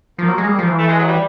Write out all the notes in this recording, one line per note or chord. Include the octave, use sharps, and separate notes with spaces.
F3 A#3
F#3
G#3
G3
F3
E3
A3
G#3
F#3
G3